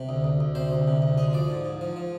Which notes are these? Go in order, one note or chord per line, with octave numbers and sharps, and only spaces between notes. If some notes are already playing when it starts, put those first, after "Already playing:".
Already playing: C3
D2
D2
D2
C3 C5
D2
C3
D2
G#3 D#5
F3 D5
G#2
G#2
F3
F3